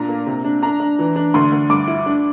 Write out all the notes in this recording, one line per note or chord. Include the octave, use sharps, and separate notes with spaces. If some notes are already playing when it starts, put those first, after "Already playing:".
Already playing: A#2 D4 A#5
A#3
C3
D4
D4 A#5
D4
E3
D4
D2 C6
D2
G2 D6
E4
D4